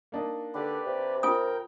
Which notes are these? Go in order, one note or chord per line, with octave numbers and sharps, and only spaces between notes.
A#3 D4 D#4
D3 G4 B4 D5
C3
F4 A#4 G5 G#5 D#6